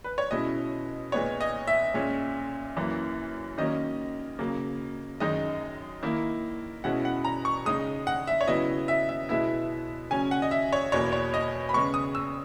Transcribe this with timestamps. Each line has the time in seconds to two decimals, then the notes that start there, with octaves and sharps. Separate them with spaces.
0.04 B4
0.18 C#5
0.31 B2 G#3 C#4 E4 D#5
1.12 A#2 G#3 B3 D#4 C#5
1.41 D#5
1.67 E5
1.94 A#2 G#3 C#4
2.77 F#2 E3 A#3
3.58 D#3 F#3 A#3 C#4 D#5
4.39 C#3 F#3 A#3
5.20 F#2 D#3 G#3 D#4 D#5
6.03 D#3 A#3 E4
6.84 B2 G#3 C#4 E4 F#5
7.05 F#5
7.25 A#5
7.45 C#6
7.65 C#3 G#3 D#4 D#6
8.07 F#5
8.27 E5
8.41 C#5
8.48 C#3 F#3 B3 E4 D#5
8.88 E5
9.09 E5
9.29 B2 G#3 B3 E4 E5
10.11 C#3 F#3 C#4 G#5
10.31 F#5
10.42 D#5
10.51 E5
10.73 C#5
10.92 E2 B2 A#3 C#5
11.13 C#5
11.34 D#5
11.69 B5
11.73 C#3 G#3 B3 C#6
11.94 D#6
12.15 E6